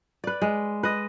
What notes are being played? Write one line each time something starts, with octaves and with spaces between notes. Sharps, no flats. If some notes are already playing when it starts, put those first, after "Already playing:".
B4 D5
G#3
B4 D#5